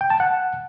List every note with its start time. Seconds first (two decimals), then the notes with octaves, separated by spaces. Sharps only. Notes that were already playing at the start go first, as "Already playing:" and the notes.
0.01 G5
0.10 A5
0.20 F#5